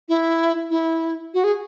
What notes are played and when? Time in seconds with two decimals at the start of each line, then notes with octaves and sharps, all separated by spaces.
0.09 E4
0.70 E4
1.34 F#4
1.44 G#4